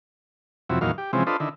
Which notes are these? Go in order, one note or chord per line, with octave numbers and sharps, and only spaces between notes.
F2 C3 F#3 E4
E2 A#2 D#3 F#3 F5
G4
C3 E3 F3 G#3 C4 C#4
D4 F4 A4 B4 C5 D#5
D3 D#3 E4